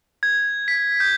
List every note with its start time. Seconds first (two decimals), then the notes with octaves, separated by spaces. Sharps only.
0.23 G#6
0.68 B6
1.00 G6